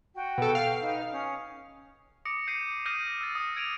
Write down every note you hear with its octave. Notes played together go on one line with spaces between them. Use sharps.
F#4 G5
B2 A4
F5
D#4 B4
C#4 D#6
D6 D#6 A#6 C#7 D7
G6 C7 D#7
D#6 F6 G6 A#6 D#7
E6 G6 A6
D#6
G#6 D7 D#7 F7